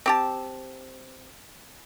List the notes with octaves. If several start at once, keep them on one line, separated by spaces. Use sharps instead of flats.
C4 G4 A5